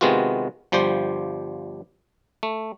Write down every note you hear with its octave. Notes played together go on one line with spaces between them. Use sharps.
C3 D#3 G#3 B3 F4 F#4
G1 F3 G3 G4 C5
A3